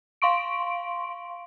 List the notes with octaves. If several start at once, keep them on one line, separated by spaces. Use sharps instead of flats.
F5 C6 C#6 D7